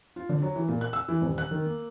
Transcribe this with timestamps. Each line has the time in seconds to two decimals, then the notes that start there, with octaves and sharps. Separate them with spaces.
0.16 F4
0.29 D3
0.42 F#3
0.56 E3
0.69 A#2
0.81 F#6
0.93 E6
1.09 E3
1.22 D#1
1.38 F#6
1.51 D#3
1.65 A#3